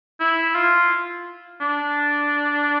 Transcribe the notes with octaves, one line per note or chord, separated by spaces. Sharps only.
E4
F4
D4